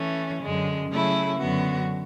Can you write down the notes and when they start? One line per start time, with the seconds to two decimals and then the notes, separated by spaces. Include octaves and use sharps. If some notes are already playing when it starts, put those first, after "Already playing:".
Already playing: E3 A3 C#4
0.41 F#2 D3 G#3
0.89 C#3 F#3 A3 E4 G#4
1.39 F#2 D3 F#3 B3 F#4